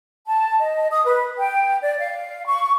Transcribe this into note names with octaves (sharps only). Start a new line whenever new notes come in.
A5
D#5
D#6
B4
G5
D5
F5
C#6